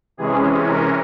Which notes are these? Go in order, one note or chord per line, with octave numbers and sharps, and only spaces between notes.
C3 E3 G#3 C#4 G#4
A#4